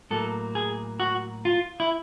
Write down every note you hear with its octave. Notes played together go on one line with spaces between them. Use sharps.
A2 F#3 A#3 A4
G#4
F#4
F4
E4